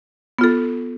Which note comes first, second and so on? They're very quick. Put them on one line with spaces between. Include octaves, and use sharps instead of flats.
B3 F4 A4